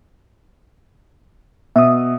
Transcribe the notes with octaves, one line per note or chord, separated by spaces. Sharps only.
B2 E5 D#6